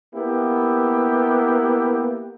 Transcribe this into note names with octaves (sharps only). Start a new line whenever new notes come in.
A#3 B3 E4 G4